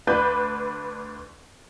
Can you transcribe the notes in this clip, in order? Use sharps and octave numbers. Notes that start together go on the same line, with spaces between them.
D2 D4 B4 B5 G6